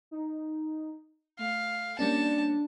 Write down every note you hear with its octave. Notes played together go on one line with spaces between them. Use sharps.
D#4
A3 F5
G3 A#3 C#4 D4 A5